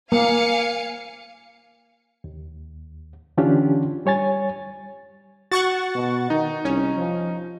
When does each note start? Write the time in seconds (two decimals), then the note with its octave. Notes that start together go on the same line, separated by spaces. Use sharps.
0.12 A#3 F5 G#5 C#7
2.24 D#2
3.38 D3 E3 C#4 D4 F4 G4
4.06 G3 C#5 G#5 A6
5.51 F#4 F#5 C#6 A6
5.95 B2
6.30 D#3 D#4
6.65 C2 C#4
6.96 F3